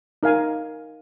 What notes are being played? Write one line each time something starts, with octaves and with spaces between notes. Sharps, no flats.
D#4 A#4 F5 G#5